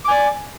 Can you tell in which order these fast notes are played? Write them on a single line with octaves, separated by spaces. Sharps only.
D6 G#5 D5